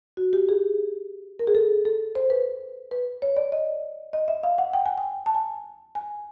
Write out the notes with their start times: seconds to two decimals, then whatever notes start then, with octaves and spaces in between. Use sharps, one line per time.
0.17 F#4
0.33 G4
0.49 G#4
1.39 A#4
1.47 G#4
1.55 A4
1.85 A4
2.15 C5
2.30 B4
2.91 B4
3.22 C#5
3.37 D5
3.52 D#5
4.13 D#5
4.28 E5
4.43 F5
4.58 F#5
4.73 G5
4.86 G#5
4.98 G5
5.26 A5
5.35 G#5
5.95 G#5